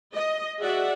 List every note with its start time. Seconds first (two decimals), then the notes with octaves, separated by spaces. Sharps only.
0.13 D#5
0.60 F#4 G#4 D5 E5 F#5